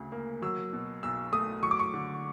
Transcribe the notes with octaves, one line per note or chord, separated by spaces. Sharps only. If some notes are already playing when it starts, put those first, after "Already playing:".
Already playing: D2 C#3
A#3
F#3 E6
B2
B1 E6
A3 D#6
F#3 C#6
D6
C#6
D3